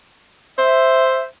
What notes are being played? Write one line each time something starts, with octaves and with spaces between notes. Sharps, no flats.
C5 E5